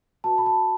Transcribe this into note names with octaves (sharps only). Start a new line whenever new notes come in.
F#4 B4 A5
B5
A5